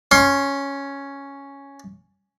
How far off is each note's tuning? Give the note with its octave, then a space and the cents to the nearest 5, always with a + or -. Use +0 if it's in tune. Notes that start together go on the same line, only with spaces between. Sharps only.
C#4 +0 C6 +35